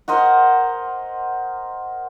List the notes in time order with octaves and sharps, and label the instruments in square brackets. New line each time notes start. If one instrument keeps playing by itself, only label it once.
[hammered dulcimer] A#4 C5 D#5 F#5